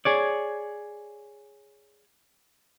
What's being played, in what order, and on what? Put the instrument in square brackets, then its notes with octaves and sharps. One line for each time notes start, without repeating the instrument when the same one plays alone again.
[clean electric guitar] G#4 C#5 D5